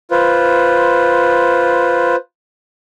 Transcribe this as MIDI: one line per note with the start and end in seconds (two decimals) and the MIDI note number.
0.11 2.16 65
0.11 2.16 71
0.11 2.16 72